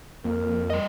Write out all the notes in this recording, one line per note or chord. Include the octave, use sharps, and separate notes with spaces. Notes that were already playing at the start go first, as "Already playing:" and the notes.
F2 A#3 A#4
G3 D#5